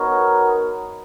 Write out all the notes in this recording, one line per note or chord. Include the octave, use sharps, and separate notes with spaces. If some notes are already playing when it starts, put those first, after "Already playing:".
Already playing: B3 D#4 F#4 A#4 C#5